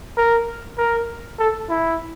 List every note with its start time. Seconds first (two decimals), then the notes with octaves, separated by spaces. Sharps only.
0.17 A#4
0.78 A#4
1.39 A4
1.69 E4